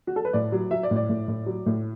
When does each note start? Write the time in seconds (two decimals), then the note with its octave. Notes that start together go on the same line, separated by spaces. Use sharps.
0.07 F#4
0.16 A4
0.25 B4
0.33 A2 D5
0.52 F#3
0.71 F#3 E5
0.83 D5
0.91 A2
0.96 D5
1.09 A2
1.28 A2
1.46 F#3
1.66 A2